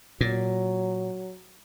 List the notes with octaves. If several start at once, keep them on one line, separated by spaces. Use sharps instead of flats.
A#2 F#3